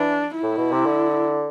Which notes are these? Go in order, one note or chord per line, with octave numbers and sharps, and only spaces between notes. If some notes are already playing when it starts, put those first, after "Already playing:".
Already playing: E3 D4
E4
A2
B2
C3
D3